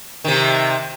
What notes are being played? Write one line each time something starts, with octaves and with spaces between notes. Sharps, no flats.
C3 D#3